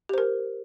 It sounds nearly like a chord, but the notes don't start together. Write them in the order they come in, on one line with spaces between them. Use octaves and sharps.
G4 C5 A#4